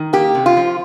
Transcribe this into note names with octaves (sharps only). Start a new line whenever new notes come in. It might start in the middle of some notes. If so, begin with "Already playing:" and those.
Already playing: D#3
A#3 G4
C3
F4
F3